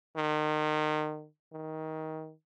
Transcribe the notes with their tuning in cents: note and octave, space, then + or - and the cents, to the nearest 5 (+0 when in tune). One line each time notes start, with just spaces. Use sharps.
D#3 -30
D#3 +20